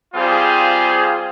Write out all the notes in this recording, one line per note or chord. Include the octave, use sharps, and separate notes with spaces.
G3 C4 F4 G#4 C5